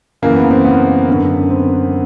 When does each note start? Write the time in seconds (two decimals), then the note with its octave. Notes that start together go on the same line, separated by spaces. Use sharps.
0.22 F#2 C#3 E3 A#3
0.36 B3
0.51 C4
0.65 B3
1.08 F#2 D3
1.50 C4